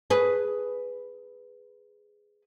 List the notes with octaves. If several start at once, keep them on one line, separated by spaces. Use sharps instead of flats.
G#4 B4